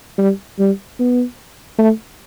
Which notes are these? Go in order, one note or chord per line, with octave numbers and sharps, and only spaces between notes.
G3
G3
B3
A3